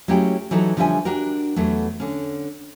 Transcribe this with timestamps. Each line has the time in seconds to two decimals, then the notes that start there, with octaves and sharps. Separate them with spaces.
0.08 F#3 G#3 A3 C#4 E4 G4
0.51 E3 F#3 D#4 A4
0.77 D3 F3 G3 C#4 E5 G#5
1.05 D4 F#4 G4 A#4
1.56 E2 F#3 A3
2.00 D3 C#4